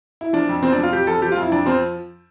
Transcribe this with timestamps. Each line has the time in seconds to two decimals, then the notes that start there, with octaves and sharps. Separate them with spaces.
0.21 E4
0.33 F3 D4
0.49 F2
0.63 F3 C4
0.73 D4
0.78 F2
0.83 F4
0.93 F2 G4
1.07 F3 A4
1.22 F3 G4
1.32 F4
1.37 F2
1.42 E4
1.52 F2 D4
1.66 F3 C4